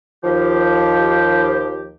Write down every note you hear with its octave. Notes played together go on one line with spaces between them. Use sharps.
D#2 F3 G4